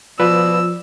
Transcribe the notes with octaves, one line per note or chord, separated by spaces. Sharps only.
B2 F3 F4 B4 D5 E6